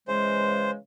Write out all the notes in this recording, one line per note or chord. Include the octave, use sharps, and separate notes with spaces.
C#3 E3 G#3 C5